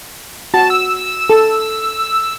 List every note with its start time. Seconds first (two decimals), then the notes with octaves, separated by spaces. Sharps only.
0.54 F#4 A5
0.70 E6
1.30 A4